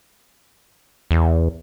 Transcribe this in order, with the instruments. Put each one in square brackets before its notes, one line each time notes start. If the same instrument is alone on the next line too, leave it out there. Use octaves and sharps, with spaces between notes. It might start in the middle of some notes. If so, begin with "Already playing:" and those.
[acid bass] E2